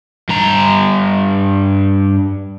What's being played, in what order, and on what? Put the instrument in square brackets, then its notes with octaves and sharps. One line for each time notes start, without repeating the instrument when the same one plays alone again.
[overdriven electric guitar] G2 A#5